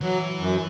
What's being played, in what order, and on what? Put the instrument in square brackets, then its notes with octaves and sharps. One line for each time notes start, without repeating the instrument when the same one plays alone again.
[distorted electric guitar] E3 [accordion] F#3
[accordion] F#2